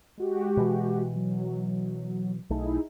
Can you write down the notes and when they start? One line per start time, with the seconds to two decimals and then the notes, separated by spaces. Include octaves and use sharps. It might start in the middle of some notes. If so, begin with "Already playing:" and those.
0.18 G#3 F#4 G4
0.57 B2 E3
1.16 F#3
2.50 B1 A3 D#4 E4 G#4